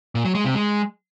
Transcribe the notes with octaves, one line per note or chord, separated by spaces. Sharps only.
A#2
F#3
G#3
C3
G#3